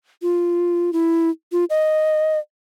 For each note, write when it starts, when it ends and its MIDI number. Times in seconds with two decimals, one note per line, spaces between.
0.22 0.93 65
0.93 1.29 64
1.52 1.65 65
1.70 2.38 75